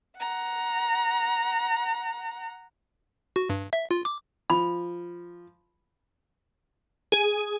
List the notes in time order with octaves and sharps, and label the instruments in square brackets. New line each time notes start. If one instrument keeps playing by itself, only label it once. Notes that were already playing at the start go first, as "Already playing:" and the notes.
[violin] F#5 A#5
[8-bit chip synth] F#4
G2
E5
F4
D6
[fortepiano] F3 [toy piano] B5
[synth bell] G#4